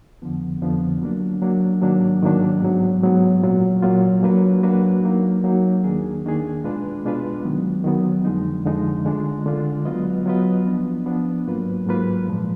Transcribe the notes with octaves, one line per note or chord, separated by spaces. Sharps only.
F2 D3 F3 B3
F2 D3 F3 B3
F#3 A#3 D4
F#3 A#3 D4
G#2 D#3 F#3 A#3 D4
G#2 D#3 F#3 A#3 D4
G#2 F#3 B3
G#2 F#3 B3
A#2 F#3 A#3 F4
A#2 F#3 A#3 F4
F#3 A#3 D4 F#4 B4
F#3 A#3 D4 F#4 B4
F#3 A#3 D#4
F#3 A#3 D#4
D#2 D#3 A#3 D4 G#4
D#2 D#3 A#3 D4 G#4
B2 G#3 D4 F4 B4
B2 G#3 D4 F4 B4
D#3 F#3 B3
D#3 F#3 B3
F2 D3 F3 G#3 D#4
F2 D3 F3 G#3 D#4
D3 G#3 D4 F4
D3 G#3 D4 F4
F#3 B3 F4 B4 D#5
F#3 B3 F4 B4 D#5
F3 B3 D4
F3 B3 D4
G#2 F#3 A#3 F4 B4
G#2 F#3 A#3 F4 B4
A#2 F3 G#3